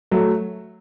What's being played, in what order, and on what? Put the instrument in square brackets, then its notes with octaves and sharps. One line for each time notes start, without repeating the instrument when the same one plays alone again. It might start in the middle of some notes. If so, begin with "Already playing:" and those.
[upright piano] F#3 A3